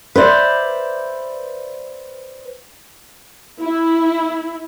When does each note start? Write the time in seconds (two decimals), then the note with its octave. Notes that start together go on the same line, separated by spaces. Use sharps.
0.15 B4 C5 D5 E5
3.61 E4